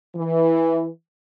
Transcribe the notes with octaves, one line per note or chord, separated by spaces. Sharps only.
E3